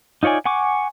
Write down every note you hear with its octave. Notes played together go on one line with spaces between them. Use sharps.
D#4 F4 C#5 D5 G#5
F#5 G#5 C#6 D6